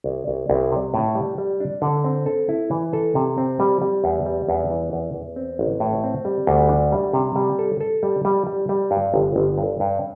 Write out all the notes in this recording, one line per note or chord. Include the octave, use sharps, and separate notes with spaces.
C2
C2
C2
C3
A2
G3
G3
D4
D3
C4
A4
E4
E3
A4
C3
C4
G3
G3
E2
G3
E2
E3
E2
E2
C4
A1
A2
C4
G3
D2
D4
G3
C3
G3
A4
A4
G3
G3
G3
G3
G2
G1
G1
G2
G2